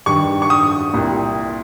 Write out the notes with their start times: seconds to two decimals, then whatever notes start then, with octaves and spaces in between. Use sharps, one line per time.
0.06 G2 D#3 G3 C#6
0.42 C#6
0.50 D#6
0.94 C2 A#2 G3